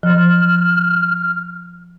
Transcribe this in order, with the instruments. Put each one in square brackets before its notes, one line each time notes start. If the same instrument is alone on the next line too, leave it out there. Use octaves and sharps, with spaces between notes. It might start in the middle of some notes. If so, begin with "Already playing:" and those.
[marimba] F3 [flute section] F6